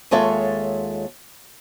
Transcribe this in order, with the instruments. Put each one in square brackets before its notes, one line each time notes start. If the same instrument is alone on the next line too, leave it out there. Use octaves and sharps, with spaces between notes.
[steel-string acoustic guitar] D#2 G#3 F4 A4 C#5 E5